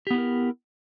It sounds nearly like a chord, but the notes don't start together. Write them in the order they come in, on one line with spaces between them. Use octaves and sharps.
G4 B3 E4 A#4